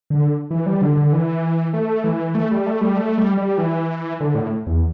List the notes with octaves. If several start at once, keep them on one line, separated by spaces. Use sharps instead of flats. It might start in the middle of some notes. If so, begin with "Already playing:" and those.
D3
E3
G3
D3
D3
E3
A3
E3
A3
G3
A3
G3
A3
G3
G3
E3
D3
A2
E2